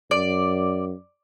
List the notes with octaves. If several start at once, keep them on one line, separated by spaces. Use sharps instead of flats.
F#2 D5